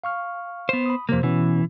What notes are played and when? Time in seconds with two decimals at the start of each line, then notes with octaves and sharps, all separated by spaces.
0.04 F5 C#6 F6
0.69 B3 C5
0.86 B5 D#6
1.09 F2 C3 A#3 C5
1.23 B2 E3 B3 C#4